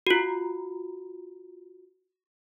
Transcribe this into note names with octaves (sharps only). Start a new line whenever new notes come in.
F4 F#4